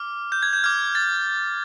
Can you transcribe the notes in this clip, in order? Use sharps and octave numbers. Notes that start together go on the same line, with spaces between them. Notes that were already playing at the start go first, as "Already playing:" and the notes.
Already playing: D6 F6
G6
G#6
G6
D6 F6 G#6
A6